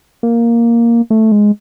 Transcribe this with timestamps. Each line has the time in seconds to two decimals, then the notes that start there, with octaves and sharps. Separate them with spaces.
0.23 A#3
1.10 A3
1.32 G#3